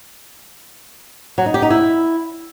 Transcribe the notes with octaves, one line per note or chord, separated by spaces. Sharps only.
F#3
D#4
G4
D#4
E4